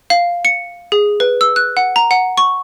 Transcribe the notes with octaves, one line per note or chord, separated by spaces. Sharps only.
F5
C#7
G#4
B4
E6
F#6
F#5
A#5
F#5
C#6